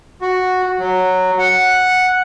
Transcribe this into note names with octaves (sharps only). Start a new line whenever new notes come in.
F#4
F#3
F#5